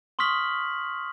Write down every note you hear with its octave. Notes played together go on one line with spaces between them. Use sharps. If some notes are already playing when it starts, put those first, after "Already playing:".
C6 C#6 D#6 F6 B6 F#7